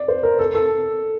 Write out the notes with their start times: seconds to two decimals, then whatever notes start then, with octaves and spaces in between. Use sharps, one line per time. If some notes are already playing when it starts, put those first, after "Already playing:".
Already playing: D5
0.08 C5
0.23 A#4
0.39 A4
0.55 A4